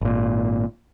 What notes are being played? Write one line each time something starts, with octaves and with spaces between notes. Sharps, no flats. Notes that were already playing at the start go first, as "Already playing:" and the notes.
G#1 A#2